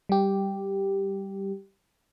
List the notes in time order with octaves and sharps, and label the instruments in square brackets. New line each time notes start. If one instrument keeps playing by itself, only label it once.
[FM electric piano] G3 G4